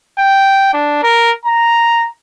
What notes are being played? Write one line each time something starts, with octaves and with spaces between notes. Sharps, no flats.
G5
D4
A#4
A#5